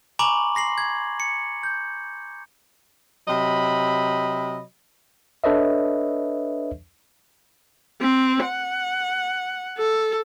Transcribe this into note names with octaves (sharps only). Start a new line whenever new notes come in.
G#5 A#5 B5 C#6 D6 F#7
C6 A#6 C7 F#7
G#6
C#7
G6
C3 F#3 D#5 B5
D4 A4 B4 C#5 D#5 E5
C4
F#5
A4